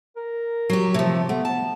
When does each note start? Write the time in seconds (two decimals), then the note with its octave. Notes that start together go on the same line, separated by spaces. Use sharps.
0.16 A#4
0.70 F#3 G4
0.94 C3 F3 A3
1.29 A3 B3
1.45 A5